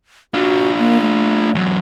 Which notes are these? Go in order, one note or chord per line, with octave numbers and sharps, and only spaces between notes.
D4 F4 F#4
A#3
A3
E2 F#3